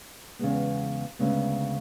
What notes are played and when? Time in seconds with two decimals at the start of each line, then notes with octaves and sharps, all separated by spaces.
0.39 E2 C#3 G#3 B3
1.19 D2 C#3 G#3 B3